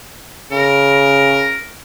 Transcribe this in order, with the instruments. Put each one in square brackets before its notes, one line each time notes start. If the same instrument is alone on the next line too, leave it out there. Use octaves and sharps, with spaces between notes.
[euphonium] C#3 [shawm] A#4